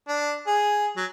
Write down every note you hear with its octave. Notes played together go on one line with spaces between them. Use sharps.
D4
G#4
F#3